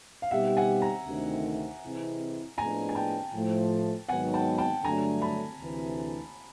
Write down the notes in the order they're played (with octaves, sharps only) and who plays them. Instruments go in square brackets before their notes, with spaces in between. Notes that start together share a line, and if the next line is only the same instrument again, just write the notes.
[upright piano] F5
[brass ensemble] B2 G3 C4 D#4 G4 [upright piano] E5 F#5
[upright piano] F#5 G#5
G#5 A#5
[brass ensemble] D2 C3 D#3
C3 E3 G#3 C4 E4
[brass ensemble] A2 F3 G#3 B3 D4 [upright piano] G#5 A#5
[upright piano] G#5
G5 A5
[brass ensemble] A2 F3 A3
[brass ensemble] G#2 D#3 F#3 B3 [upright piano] F#5 G#5
[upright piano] G5 A5
G5 A5
[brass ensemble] G2 D3 F#3 A3 [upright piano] G#5 A#5
[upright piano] A5 B5
[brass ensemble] D2 C3 E3